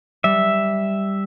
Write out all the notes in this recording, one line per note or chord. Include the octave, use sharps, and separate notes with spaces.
G3 E5